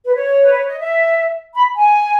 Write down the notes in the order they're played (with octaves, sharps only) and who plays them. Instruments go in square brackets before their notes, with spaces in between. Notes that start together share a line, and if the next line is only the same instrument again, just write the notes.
[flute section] B4
C#5
B4
C#5
D#5
E5
B5
G#5